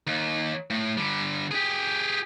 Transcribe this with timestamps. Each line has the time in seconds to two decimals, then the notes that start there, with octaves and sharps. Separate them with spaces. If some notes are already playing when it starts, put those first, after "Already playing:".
0.07 D#2
0.70 A2
0.97 D3 G3
1.51 G4 G#4